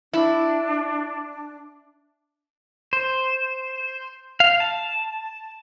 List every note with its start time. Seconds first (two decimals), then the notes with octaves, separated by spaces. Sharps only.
0.13 D4 E4
2.93 C5
4.40 F5
4.60 A5